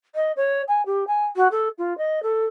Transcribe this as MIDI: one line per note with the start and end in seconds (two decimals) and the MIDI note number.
0.15 0.32 75
0.36 0.62 73
0.68 0.85 80
0.86 1.07 67
1.07 1.25 80
1.36 1.48 66
1.51 1.69 69
1.78 1.96 65
1.98 2.22 75
2.23 2.45 69